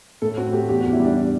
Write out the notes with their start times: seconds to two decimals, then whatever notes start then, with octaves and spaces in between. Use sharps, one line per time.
0.22 A2 A4
0.37 C4 F#4
0.53 A3 G4
0.69 E2 G4
0.81 F#4
0.85 E2
0.92 E4
1.00 G3 D4